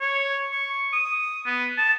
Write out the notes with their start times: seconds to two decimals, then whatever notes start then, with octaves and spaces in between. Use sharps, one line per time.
0.01 C#5
0.53 C#6
0.93 D#6
1.46 B3
1.78 A5